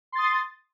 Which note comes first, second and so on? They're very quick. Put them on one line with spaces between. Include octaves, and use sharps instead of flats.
C6 A6 D#6